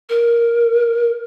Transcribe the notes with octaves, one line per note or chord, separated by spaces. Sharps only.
A#4